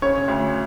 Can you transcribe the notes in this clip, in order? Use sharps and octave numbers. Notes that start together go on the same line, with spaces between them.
C#3 C#5
D2